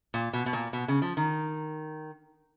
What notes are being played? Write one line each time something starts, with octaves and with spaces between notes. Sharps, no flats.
A#2
B2
B2
A#2
B2
C#3
F3
D#3